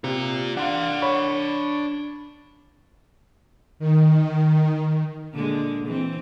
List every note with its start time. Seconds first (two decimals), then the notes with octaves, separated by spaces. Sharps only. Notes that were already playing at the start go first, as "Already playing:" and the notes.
0.04 C3 F4 A#5
0.57 D4 F5 F#5 C6
1.02 C#5 B5 C#6
3.79 D#3
5.32 A#2 D3 G#3
5.86 E3 C4